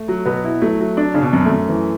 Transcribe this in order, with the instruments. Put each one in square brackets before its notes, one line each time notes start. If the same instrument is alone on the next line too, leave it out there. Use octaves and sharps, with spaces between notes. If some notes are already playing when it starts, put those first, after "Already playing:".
Already playing: [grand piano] A3
[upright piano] F#3
[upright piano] B2 [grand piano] B3
[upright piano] E4
[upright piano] F#3 [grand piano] A3
[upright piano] F#3
D4
[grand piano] C#3 [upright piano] D4
[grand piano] B2
[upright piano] F#2
[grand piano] A3
[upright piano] F#2
E3